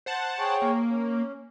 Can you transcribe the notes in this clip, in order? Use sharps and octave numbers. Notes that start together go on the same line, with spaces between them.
C5 F#5 A5
G#4 C#5 G5
A#3
C#4